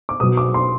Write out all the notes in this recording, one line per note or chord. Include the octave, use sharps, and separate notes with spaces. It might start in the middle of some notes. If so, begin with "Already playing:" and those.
D6
B2 F#3 D#6
D6
C6